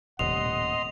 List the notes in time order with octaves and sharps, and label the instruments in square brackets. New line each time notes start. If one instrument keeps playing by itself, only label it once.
[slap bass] D#1 A2 C3 [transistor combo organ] D#5 C6 [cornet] F#5 [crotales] F7